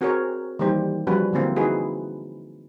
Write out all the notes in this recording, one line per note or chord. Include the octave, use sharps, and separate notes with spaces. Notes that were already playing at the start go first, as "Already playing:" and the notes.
C4 F#4 G#4 A#4 C5 C#5
D#3 E3 G3 A#3 G4 C5
F3 G3 C#4 F#4 B4
D3 F#3 A#3 C4 E4
D#4 E4 F#4 G#4 B4